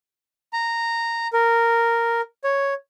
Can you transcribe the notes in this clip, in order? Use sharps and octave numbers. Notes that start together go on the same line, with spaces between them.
A#5
A#4
C#5